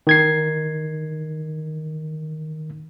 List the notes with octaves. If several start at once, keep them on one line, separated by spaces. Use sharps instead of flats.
D#3 G#6 C7